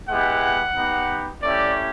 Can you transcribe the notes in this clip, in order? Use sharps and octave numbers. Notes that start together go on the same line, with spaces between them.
G#3 B3 E4 G4 F#5
B3 D#4 G4
A3 C#4 E4 G4 D5